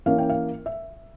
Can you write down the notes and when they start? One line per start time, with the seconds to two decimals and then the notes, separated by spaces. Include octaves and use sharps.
0.06 E3 A#3 C#4 F5
0.18 G5
0.30 F5
0.66 E5